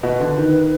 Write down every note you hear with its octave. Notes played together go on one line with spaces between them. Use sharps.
B2 B4
D3
D#3